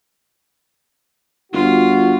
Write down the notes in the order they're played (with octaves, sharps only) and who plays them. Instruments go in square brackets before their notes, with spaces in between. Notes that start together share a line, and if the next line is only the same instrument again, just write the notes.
[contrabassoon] G1 [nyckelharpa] F4 [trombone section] F#4